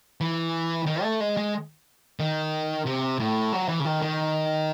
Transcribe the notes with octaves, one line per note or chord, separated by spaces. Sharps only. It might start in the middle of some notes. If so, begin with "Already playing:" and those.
E3
D#3
A3
G#3
G#3
D#3
C3
A2
F#3
E3
C#3
D#3
D#3